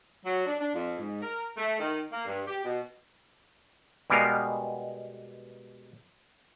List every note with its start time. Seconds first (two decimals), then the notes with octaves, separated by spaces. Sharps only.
0.25 F#3
0.45 D4
0.59 D4
0.75 F2
0.98 G#2
1.21 A#4
1.57 A3
1.79 D#3
2.12 A#3
2.26 G2
2.47 G4
2.63 B2
4.10 B2 G3 G#3 B3 A#4 F5